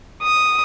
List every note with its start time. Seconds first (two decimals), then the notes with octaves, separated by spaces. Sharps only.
0.23 D#6